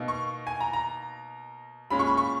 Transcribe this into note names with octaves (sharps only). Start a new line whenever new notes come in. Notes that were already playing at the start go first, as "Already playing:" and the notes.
Already playing: B2 A#3 D#4
C#6
G#5
A#5
A#5
A#2 G#3 C#4 B5
C#6
B5
C#6